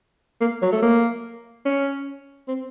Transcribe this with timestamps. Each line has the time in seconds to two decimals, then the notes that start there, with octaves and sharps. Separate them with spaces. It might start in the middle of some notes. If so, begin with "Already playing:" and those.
0.41 A#3
0.62 F#3
0.72 A3
0.83 A#3
1.66 C#4
2.48 C4